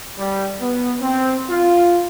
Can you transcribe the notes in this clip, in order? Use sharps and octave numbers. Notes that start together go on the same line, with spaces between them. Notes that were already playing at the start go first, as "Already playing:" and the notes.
G3
B3
C4
F4